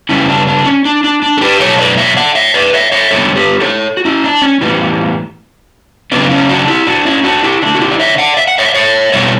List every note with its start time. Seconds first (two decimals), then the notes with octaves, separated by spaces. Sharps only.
0.09 C#3 G3 B3 C#4 E4
0.29 D4
0.47 D4
0.65 C#4
0.85 D4
1.04 D4
1.23 D4
1.37 A4
1.41 G4 B4
1.60 B2 F#3 A3 A4 C#5
1.79 B4 D5
1.98 C#5 E5
2.17 D5 F#5
2.35 C#5 E5
2.54 B4 D5
2.73 C#5 E5
2.92 C#5 E5
3.11 D3 G3 B3 A4 C#5
3.36 G4 B4
3.60 A4 C#5
3.97 F#4
4.05 C#4 E4
4.24 D4
4.42 C#4
4.61 A2 E3 G3 B3
6.12 C#3 F#3 B3 D4
6.30 C#4 E4
6.49 D4 F#4
6.68 E4 G4
6.87 D4 F#4
7.05 C#4 E4
7.24 D4 F#4
7.43 E4 G4
7.62 D3 A3 D4 F#4
7.75 F#4
7.80 E4 G4
7.91 D5
8.00 C#5 E5
8.18 D5 F#5
8.37 E5
8.47 F#5
8.58 C#5 E5
8.68 D5
8.74 C#5 E5
9.12 B2 G3 B3 C#5 E5